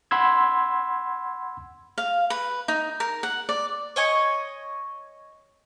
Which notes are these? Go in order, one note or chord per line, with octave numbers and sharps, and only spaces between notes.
F#5 B5 C6 E6 G#6
F5
B4
D#4
A#4
F#5
D5
C#5 D#5 G#5 C#6